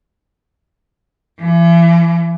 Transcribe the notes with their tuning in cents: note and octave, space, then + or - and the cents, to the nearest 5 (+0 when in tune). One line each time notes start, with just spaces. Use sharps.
E3 +40